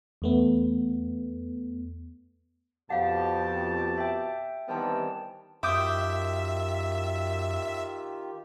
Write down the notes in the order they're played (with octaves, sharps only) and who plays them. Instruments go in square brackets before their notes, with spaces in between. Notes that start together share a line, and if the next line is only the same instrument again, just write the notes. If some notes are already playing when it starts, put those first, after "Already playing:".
[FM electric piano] E2 A3 B3
[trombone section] F2 [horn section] B2 G4 A5 [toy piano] F5 F#5
[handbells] E5 G5
[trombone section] D#3 E3 C4 [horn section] G3 B3 [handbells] G5 A5
[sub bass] F#2 [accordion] D#3 F4 G4 [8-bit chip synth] E5 [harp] D6 D#6 G6